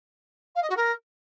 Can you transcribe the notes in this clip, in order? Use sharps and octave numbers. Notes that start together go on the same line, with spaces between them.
F5
D#5
F#4
A#4